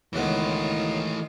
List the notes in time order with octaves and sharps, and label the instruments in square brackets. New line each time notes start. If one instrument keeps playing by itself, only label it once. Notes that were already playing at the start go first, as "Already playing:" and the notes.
[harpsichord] C#2 B3 [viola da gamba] D#3 F4 [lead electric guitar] E3 A3